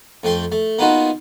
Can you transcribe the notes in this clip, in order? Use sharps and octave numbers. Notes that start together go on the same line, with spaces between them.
F2 A3 G5 C6
A3
A#3 B3 D#4 F4 F#4